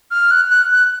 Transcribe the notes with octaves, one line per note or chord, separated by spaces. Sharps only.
F6
F#6
F#6
F#6